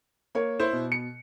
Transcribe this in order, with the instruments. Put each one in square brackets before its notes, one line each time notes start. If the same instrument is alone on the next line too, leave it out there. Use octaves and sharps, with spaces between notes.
[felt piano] A#3 C#5
[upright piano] E4 C5
[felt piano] B2
[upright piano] C#7